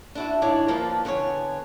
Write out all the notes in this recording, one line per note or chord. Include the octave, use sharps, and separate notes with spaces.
D4 E4 F#4
G#2 D#3 D4 E4 C#5 D5
F3 A#3 D4 F4 B4
D3 B3 G#4 C#5